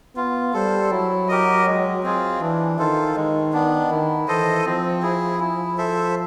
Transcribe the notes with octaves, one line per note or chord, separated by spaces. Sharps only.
B3 F4
G3 A4 C5
F#3 E4
G4 A#4 D#5
G#3
C4 F4 G#4
E3 D4
D#3 F4 A4 C5
D#3 G#3
B3 D4
D#3 E4
E3 A4 C5 D#5
F3 C4
E4 G#4
E4
A4 C5 E5